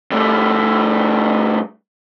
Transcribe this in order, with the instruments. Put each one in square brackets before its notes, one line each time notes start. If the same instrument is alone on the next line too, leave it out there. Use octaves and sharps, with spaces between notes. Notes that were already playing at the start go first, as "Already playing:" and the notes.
[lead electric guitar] G2 A3